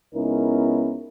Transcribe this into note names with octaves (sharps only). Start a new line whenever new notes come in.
C#2 B3 C#4 D#4 E4 A#4